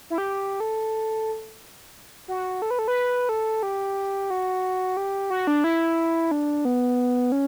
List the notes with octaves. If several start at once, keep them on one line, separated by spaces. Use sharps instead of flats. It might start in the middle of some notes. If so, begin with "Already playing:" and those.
E4
G4
A4
F#4
A4
B4
A4
B4
A4
G4
F#4
G4
F#4
D4
E4
D4
B3
C#4